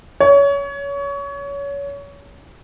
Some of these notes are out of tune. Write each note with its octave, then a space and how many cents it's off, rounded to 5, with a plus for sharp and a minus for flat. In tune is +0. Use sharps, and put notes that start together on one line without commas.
C#5 +25